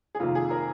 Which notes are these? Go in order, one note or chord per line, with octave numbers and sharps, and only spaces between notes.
G#4
F2 C3 D#3 A#3 F4
G#4
A#4